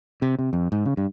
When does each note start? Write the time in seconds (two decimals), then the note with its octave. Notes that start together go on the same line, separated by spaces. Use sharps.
0.22 C3
0.39 C3
0.53 F2
0.72 G#2
0.85 C#3
0.97 G2